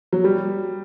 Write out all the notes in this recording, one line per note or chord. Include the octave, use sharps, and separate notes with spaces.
F#3
G3